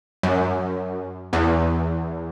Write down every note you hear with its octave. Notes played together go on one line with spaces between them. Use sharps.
F#2
E2